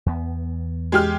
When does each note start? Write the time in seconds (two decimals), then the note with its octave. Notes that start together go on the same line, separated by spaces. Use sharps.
0.06 E2 B3
0.92 G#3 G4 F6